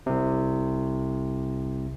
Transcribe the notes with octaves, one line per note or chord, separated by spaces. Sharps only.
C2 C3